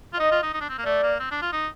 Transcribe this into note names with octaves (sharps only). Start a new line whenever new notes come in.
F4
D#4 D#5
F4
D#4
D#4
D4
C4
A#3
A3 D5
A#3
C4
D4
F4
D#4